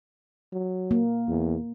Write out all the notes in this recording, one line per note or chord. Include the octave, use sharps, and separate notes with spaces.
F#3
A#3
E2